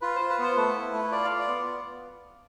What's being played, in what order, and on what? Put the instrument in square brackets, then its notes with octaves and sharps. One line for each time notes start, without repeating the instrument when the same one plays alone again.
[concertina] F4 B4
F4 C5
B4
B3 C5
A3 B4
E4
A3
F4 D5
F5
F4
D5
B3